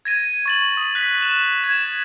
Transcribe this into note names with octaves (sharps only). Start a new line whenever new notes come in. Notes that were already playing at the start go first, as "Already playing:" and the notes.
G#6 A#6 D#7
C#6 A6 F#7
D#6
F#6 B6
F#6 E7
G#6 E7